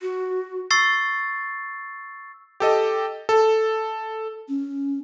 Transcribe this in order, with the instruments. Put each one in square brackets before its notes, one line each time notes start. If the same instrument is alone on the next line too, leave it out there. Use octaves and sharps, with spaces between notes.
[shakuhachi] F#4
[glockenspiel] C#6 E6 A6 C7
[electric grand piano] G4 A4 D#5
A4
[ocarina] C#4